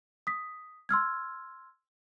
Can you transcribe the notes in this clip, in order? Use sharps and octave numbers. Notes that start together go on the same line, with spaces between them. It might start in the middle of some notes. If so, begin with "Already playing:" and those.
D#6 B6
C6 E6 F6 G#6